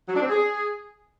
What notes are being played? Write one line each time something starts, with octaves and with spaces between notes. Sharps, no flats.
F#3
D4
C4
G#4